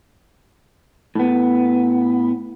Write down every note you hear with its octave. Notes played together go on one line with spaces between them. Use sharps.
A2 B3